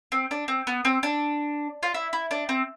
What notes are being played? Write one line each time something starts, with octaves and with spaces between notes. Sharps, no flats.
C4
D4
C4
B3
C4
D4
F4
E4
E4
D4
C4